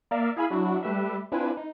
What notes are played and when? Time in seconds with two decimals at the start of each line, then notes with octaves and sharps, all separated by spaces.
0.11 A#3 A#4 D5 E5 F5
0.36 E4 G#4 F5 G#5 B5
0.50 F#3 D4 E4 F#4
0.83 G3 A3 G4 B4 E5
1.32 C4 D4 E4 F4 B4 G#5
1.57 D#4